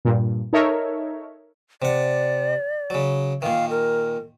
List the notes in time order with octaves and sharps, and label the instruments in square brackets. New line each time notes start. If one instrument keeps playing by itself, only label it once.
[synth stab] G2 A#2
D#4 A4 A#4 C#5 E5
[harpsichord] C3 F#5 [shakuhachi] D5
[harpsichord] C#3 F#3
[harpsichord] A#2 D#3 [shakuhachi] F5
[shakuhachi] A#4